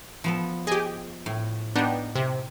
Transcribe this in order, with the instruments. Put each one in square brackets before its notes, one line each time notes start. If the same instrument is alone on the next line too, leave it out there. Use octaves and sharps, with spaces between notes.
[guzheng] F3 B3 A4
[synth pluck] G4 G#4 [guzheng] D#5
[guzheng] A2
[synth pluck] B3 D4 [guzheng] D#4 G4
[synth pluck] C3